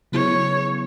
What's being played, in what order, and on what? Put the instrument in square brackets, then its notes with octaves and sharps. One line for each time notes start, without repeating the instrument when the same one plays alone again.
[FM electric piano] C#3 F#3 B3 E4 G#4 [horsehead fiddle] C#5